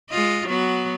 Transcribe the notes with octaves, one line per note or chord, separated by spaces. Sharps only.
G#3 F4 D#5
F#3 B3 F#4